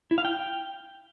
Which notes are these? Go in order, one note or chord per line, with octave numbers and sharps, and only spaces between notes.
E4
F5
G5